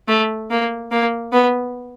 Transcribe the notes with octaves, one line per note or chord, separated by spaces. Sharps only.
A3
A#3
A#3
B3